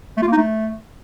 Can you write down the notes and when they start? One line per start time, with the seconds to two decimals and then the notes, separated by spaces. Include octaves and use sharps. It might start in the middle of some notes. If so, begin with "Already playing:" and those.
0.17 A3
0.22 F4
0.27 A#3
0.32 D#4
0.37 A3